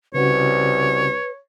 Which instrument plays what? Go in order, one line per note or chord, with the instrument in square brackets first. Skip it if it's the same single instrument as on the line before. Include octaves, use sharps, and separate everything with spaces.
[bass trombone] C2 [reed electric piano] C#3 C#4 F#4 [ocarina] B4 [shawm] C#5